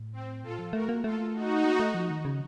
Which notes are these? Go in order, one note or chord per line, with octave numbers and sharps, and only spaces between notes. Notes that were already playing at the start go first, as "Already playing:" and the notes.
Already playing: A2
C4
A#2 F4 A4
F3
A3 F#4 A#4
A#3
A3 F4 A4
D#4 F#4
A#3
A3
F3
D#3
C#3